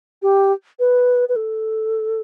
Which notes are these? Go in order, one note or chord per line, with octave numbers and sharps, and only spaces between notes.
G4
B4
B4
A4